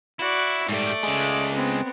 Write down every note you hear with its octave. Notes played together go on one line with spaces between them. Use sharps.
E4 F#4 D5
G#2 G3 A3 D5
C#3 G#3
B3 C4